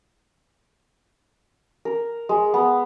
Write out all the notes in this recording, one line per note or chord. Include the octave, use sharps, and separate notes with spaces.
A#4
G#3
B3